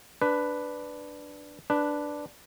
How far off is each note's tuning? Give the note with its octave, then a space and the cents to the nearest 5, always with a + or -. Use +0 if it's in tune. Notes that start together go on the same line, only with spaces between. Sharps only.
D4 +0 B4 +5
D4 +0 B4 +0